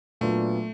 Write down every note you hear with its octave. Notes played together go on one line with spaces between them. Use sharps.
A#2 F#3 A3 B3 D4 F4